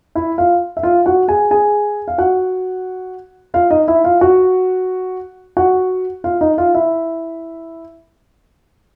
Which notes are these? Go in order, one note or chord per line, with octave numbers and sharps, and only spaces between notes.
E4 E5
F4 F5
E5
F4 F5
F#4 F#5
G#4 G#5
G#4 G#5
F5
F#4 F#5
F4 F5
D#4 D#5
E4 E5
F4 F5
F#4 F#5
F#4 F#5
F4 F5
D#4 D#5
F4 F5
E4 E5